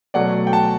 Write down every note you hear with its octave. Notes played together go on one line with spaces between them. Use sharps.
B2 F#3 A3 D5 F#5
G5
F#5 A5